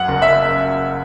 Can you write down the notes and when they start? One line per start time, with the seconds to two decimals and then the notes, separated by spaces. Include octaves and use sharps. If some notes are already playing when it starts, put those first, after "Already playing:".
Already playing: F#2 F#5
0.08 F#1
0.22 E5